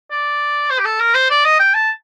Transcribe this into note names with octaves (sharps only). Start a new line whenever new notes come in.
D5
C5
G4
A4
A#4
C5
D5
D#5
G5
A5